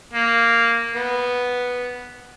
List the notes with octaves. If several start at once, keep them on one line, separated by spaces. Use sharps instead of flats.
A#3
B3